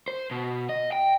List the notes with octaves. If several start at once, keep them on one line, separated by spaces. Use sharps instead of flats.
C5
B2
D#5
G5